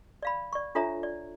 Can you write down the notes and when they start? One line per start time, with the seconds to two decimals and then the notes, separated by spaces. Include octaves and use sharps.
0.23 D5 F5 B5
0.53 D5 C#6
0.75 D4 F4 A4 C#5 E5 A#5
1.03 D5